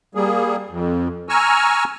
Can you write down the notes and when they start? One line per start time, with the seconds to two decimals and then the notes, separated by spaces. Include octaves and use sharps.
0.15 G3 A#3 G#4
0.69 F2
1.29 G#5 A#5 C#6 E6 F6